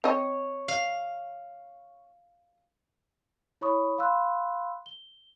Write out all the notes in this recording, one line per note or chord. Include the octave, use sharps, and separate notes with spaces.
C4 C#5 D#5
F5
E4 C#5 B5 C#6 D#6
F5 B5 C6 E6 F#6
G7